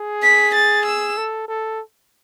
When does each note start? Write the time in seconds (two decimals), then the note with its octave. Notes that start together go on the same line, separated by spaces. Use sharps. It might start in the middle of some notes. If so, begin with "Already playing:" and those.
Already playing: G#4
0.23 B6
0.55 A6
0.86 E6
1.17 A4
1.48 A4